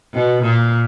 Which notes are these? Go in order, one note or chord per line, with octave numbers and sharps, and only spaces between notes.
B2
A#2